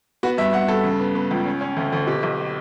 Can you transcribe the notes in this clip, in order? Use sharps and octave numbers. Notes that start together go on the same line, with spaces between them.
B3 F#4
G2 E5
G2 F#5
G2 A4
C#3
B3
B3
C#2
C#4
C#4
D2
D2
B2 G4
B1